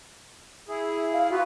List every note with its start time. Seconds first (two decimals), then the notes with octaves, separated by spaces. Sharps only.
0.68 E4 G#4
0.95 E5
1.11 F5
1.30 B3 F4 F#4 B4